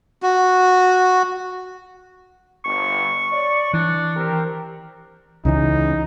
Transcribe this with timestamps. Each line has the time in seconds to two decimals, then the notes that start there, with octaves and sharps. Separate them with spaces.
0.22 F#4
2.65 G1 C#6
3.32 C#5 D5
3.74 E3 D4
4.16 C4 G4 A#4
5.45 C#2 C#3 E3 D#4